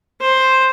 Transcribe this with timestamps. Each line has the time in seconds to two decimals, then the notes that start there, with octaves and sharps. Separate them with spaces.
0.21 C5